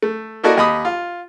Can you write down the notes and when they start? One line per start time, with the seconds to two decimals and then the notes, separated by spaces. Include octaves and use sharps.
0.03 A3
0.44 A#3 E4 F#4 A4 D5 D#5
0.57 D#2 D#5 B5 D#6
0.85 F4